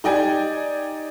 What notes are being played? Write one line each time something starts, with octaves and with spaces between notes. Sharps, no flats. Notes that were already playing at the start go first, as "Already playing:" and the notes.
D#4 G4 D5 D#5 G5 G#5